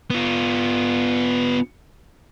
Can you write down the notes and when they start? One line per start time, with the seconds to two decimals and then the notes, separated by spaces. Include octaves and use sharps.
0.10 B3 F4